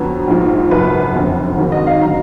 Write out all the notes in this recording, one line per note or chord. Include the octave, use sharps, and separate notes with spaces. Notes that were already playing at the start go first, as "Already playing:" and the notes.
Already playing: F2 D3 F#3 B3
A#1 G#2 F3
F#1 F#2 F3 B4
F1 F2 D3
G#1 G#2 D#3 F#3
D#5
F5
D3 F#3 A#5